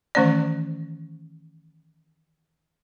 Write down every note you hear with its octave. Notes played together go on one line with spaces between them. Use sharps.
D#3 E3 A3 C#4 C5 D5